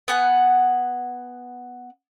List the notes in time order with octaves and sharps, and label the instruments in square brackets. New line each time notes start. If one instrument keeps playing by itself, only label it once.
[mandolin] B3 F#5 G#5